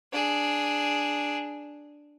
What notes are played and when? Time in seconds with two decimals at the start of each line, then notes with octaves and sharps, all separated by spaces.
0.13 D4 G#4